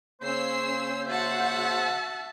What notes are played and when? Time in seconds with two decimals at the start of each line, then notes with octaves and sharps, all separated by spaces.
0.22 C#3 A#3 C#4 C5 E6 C7
1.07 F#4 E5 F#5 A5